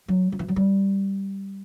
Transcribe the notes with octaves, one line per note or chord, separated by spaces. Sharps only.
F#3
F#3
E3
F#3
G3